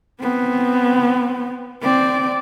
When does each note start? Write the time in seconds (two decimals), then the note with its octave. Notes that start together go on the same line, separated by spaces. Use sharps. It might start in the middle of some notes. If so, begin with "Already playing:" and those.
0.20 B3 C4
1.82 C4 D5